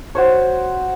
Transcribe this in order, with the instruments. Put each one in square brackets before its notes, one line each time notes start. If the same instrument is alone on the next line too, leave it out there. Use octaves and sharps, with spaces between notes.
[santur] F#4 C5 C#5